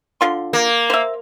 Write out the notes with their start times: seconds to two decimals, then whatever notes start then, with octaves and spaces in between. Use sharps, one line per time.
0.21 D3 F4 C6
0.53 A#3
0.90 C5 E5